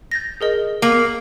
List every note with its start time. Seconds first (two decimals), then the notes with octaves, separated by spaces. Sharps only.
0.11 G6 A6 A#6
0.41 G#4 A#4 D#5
0.82 A#3 F#7